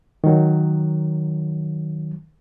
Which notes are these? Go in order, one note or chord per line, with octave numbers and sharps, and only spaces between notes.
D#3 F#3